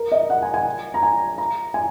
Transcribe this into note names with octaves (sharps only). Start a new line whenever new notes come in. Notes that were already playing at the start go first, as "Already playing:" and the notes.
Already playing: A#4
D#5
F#5
G#5
G#5
A#5
G#5
A#5
G#5